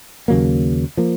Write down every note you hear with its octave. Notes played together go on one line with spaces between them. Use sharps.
D#2 C#3 F#3 A#3
F3 A#3